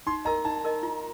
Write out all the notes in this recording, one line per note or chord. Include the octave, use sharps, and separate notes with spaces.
D#4 C6
A#4 D#5 A#5
D#4 A5
A#4 D#5
F4